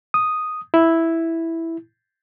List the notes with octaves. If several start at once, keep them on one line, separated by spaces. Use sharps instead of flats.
D#6
E4